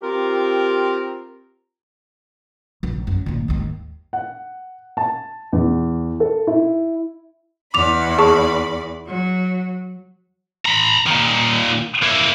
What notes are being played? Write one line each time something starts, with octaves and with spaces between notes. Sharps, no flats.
C4 F4 G4 A#4
A#1
F#2
D#2 A#2
D#2 G#2
F#5
A5
E2
A4
E4
E2 D5 B5 D6 F7
G#4 A5 C#6
F#3
A#5 B5
A#2 D#3
A#3 E4